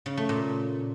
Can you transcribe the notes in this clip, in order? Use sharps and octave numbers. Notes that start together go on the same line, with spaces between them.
C#3
A3
A#2